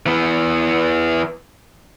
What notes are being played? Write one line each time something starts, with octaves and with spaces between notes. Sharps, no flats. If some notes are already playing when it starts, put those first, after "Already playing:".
E3 B3